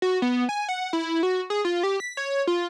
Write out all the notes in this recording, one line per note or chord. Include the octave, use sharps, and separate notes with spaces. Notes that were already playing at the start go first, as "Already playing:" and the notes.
F#4
B3
G#5
F#5
E4
F#4
G#4
F4
G4
B6
C#5
F4